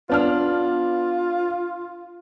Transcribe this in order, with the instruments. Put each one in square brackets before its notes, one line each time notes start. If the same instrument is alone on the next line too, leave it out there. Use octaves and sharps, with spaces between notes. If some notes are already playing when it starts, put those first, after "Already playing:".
[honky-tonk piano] B3 D4 F6 [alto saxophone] F4